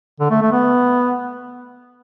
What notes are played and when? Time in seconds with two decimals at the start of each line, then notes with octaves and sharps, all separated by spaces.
0.20 D3
0.30 A3
0.42 A3
0.52 B3